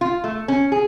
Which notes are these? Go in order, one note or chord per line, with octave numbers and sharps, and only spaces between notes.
F4
A3
C#4
G#4